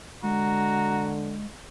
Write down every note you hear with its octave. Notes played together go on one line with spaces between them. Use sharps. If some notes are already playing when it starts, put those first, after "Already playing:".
D3 G#3 F#4 A#5